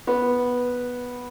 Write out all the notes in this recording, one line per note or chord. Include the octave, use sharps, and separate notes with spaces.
B3